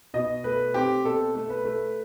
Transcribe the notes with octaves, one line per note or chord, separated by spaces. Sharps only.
B2 D#5
A3 B4
C4 G4
B2 A4
A3
B4
A3